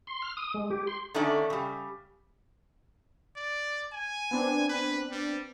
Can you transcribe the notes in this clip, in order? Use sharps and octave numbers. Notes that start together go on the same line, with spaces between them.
C6
F6
D#6
G#3
G4
C6
D3 D#3 A3 C#4 D5
C#3 G3
D5
G#5
B3 C4 D4
B4
G3